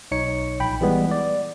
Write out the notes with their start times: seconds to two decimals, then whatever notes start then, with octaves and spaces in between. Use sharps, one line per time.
0.11 B1 D#4 C#5 C#7
0.60 A#1 G5 B5
0.81 E3 G3 G#3 B3
1.11 D5